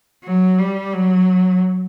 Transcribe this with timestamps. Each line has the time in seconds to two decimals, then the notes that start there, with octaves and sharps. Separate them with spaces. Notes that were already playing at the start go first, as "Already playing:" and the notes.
0.24 F#3
0.59 G3
0.94 F#3